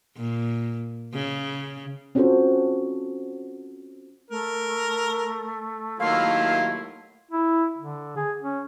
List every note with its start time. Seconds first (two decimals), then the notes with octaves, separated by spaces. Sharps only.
0.16 A#2
1.14 C#3
2.15 C4 C#4 F4 F#4 A4 C5
4.30 A3 A#4
6.00 D#2 D#3 F#3 A#3 E4 F4 F5
7.31 E4
7.78 D3
8.17 G#4
8.42 C#4